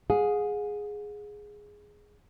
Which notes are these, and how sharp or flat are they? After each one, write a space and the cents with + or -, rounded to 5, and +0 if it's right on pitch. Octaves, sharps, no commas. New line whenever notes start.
G#4 +0 F#5 -45